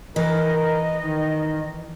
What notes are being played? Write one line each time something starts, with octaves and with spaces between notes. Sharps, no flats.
E3 A#4 D#5
D#3